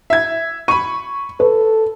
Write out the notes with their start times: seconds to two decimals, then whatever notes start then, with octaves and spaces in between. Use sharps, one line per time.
0.10 E5 G#6
0.68 B5 C#6 D#7
1.40 A4 B4